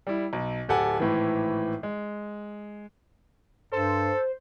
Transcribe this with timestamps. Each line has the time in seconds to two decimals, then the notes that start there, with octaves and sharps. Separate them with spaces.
0.07 G3 E4
0.33 B1
0.69 D1 G4 A4 F#5 G#5
1.00 G#1 A2 E3
1.83 G#3
3.72 G2 A4 C5